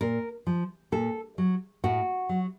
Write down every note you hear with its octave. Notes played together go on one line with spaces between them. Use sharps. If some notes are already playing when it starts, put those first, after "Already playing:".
A#2 A#4
F3
A#2 A4
F#3
A2 F#4
F#3